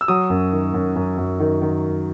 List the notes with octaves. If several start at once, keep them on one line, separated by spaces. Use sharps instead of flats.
E6
F#3 D#6
F#2
D#3
F#2
F#2
F#2
D#3
D#3